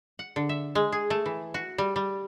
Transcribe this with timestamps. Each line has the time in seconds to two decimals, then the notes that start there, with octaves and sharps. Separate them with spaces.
0.19 F#5
0.36 D3
0.49 E5
0.75 G#3
0.92 G#4
1.10 A3
1.26 E3
1.54 F#4
1.78 G3
1.96 G3